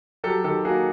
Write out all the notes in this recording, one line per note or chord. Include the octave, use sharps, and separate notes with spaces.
F#3 G4 A4
D#3 G4 A4
A#3 F#4 G#4